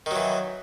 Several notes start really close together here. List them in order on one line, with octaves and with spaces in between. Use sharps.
D#3 F#3 E3